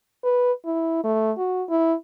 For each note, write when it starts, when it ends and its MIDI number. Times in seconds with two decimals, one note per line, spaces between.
0.24 0.52 71
0.65 1.00 64
1.04 1.31 57
1.38 1.63 66
1.70 1.94 64